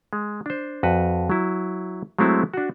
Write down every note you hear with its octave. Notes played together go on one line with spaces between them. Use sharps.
G#3
D4 C5
F2 F#4 B4
F#3 E4
F#3 G#3 A3 C4 E4
D4 F#4